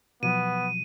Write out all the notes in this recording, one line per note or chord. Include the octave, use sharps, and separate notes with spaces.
B2 F3 F#3 B3 D#7